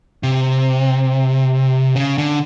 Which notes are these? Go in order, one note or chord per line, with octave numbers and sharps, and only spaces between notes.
C3
C#3
D3